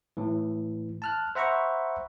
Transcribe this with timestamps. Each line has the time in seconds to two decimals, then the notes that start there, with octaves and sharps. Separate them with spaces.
0.17 A2 E3
1.02 A5 F6 F#6
1.35 C5 E5 F#5 A#5 B5 C#6